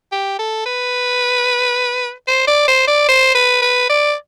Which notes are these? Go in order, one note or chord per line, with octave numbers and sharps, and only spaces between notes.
G4
A4
B4
C5
D5
C5
D5
C5
B4
B4
D5